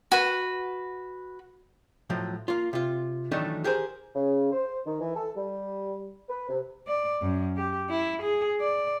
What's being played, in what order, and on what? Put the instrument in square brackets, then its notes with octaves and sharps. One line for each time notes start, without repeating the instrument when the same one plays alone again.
[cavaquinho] F#4 B4
[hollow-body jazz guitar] A2 F3 F#3
A#3 F4
C3 F4
D#3 E3 F#3 A3 D4 D#4
G4 G#4 A#4 C5
[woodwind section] C#3
C5
D#3
E3
A4
G3
B4
C3
[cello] D5
F#2
G4
E4
G#4
D5